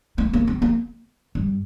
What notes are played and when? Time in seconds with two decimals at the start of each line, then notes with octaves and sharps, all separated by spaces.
0.18 A3
0.33 A#3
0.47 C4
0.62 A#3
1.35 G2